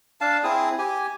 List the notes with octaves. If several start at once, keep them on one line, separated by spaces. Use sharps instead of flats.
D4 F5 A5
C4 E4 G#4 D#6
G4 G#5